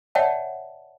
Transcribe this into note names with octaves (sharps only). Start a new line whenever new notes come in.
C#5 D5 E5 F#5 G5 A5